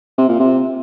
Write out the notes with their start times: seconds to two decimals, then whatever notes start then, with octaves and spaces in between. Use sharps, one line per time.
0.18 C3
0.29 A#2
0.39 C3